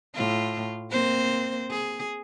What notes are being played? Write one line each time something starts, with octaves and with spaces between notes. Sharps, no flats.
A2 F4
A#3 C4 C5
G#4